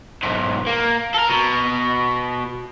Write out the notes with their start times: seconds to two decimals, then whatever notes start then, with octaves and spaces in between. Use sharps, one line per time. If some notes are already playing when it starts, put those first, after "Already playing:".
0.23 B1 G#2
0.67 A#3
1.14 A4 A#4
1.29 B2